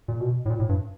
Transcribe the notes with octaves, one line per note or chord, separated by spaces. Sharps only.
A#2
B2
A2
A#2
A2
G2